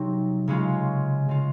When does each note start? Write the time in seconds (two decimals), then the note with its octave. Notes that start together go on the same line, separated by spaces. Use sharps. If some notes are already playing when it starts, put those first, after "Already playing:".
Already playing: C3 F#3 C4 D#4
0.48 C#3 G#3 C#4 F4
1.28 C#3 G#3 C#4 F4